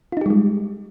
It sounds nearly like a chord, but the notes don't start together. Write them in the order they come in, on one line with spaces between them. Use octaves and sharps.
F4 D#4 G4 G3 G#3